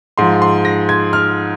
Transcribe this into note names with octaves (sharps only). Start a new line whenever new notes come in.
G#2 F3 C6
C6
A#6
G#6
F6